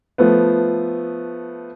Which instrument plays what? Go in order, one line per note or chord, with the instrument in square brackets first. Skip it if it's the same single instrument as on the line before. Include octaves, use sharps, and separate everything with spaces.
[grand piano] F3 A3 B3